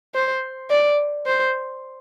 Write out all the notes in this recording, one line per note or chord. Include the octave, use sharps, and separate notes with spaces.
C5
D5
C5